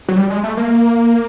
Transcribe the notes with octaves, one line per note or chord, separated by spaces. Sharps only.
F#3
G3
G#3
A3
A#3